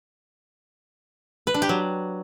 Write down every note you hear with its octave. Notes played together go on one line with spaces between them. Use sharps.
B4
D4
G4
F#3